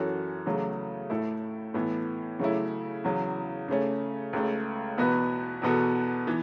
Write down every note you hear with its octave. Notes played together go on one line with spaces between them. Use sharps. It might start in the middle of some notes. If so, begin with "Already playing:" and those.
Already playing: F#2 E3 C#4 F#4 A4
E2 C#3 F#3 A3
A2 A3 E4 A4
A2 E3 B3 A4
C#3 F#3 A3 C#4 E4
E2 C#3 F#3
C#3 A3 C#4
C#2 C#3 A3
E2 B2 B3 F#4 B4
E2 B2 B3 F#4 A4
E3 B3